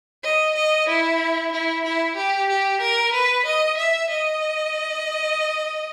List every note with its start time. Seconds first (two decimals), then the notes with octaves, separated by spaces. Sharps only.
0.24 D#5
0.55 D#5
0.88 E4
1.52 E4
1.84 E4
2.16 G4
2.49 G4
2.81 A#4
3.13 B4
3.46 D#5
3.77 E5
4.10 D#5